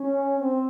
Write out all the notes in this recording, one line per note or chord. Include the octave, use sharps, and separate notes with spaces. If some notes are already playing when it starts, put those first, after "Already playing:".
Already playing: C#4
C4